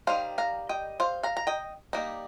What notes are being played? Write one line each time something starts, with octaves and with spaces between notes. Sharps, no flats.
D#3 G3 D#4 C5 F5
F5 A#5
D#5 G5
C5 F5
F5 A#5
A#5
D#5 G5
G3 A#3 D#4